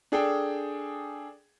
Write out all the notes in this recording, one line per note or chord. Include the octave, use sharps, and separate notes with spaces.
D4 G#4 A4 G5